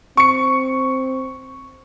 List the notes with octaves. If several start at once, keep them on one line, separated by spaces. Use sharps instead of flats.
C4 C#6 C#7